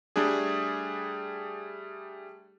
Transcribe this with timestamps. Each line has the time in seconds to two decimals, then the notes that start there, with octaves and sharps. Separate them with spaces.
0.16 G3 A3 D4 G#4